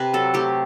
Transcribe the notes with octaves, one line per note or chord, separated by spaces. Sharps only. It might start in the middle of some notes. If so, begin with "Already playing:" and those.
Already playing: C3 B4
F#3 A4
A3 G4